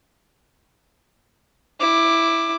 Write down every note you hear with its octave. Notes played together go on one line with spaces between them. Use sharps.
E4 D6